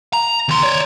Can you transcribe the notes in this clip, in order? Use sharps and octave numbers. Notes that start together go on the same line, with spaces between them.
A#5
D#2 C6
C#5 D5